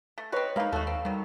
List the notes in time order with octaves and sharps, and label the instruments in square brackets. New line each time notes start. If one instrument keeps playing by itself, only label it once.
[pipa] A3
[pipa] C4 B4 [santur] C#5 D#5 B5
[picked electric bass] G#3 [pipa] A#3 D#4 [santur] F5 B5
[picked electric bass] D#2 [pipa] A3 F#4 [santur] A4 F5
[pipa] C4
[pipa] D#3 F#3 [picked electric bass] G3